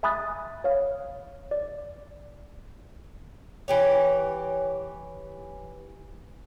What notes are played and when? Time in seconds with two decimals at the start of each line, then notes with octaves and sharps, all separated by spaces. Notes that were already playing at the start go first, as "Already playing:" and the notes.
0.03 E5 G#5 B5 D#6 F#6 A6
0.64 C#5 F5
1.51 D5
3.68 E3 G4 C#5